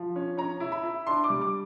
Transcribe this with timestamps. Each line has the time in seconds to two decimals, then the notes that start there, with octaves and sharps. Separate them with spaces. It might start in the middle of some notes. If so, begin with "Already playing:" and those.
Already playing: F3
0.16 C#4
0.37 C#4 A#5
0.60 E4
0.72 B5
0.84 E4
1.07 D4 C6
1.24 D6
1.30 G3
1.42 D6